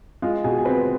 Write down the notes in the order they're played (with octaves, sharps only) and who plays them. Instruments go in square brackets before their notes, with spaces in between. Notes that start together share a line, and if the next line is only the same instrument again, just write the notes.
[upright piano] G#3 [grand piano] F4 F5
[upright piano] B2 [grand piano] G#4 G#5
[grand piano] G#5
[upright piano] C4 [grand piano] B4 B5